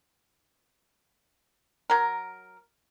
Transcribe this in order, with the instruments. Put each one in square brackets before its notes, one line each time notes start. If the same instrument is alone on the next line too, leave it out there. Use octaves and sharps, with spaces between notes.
[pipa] F#3 A#4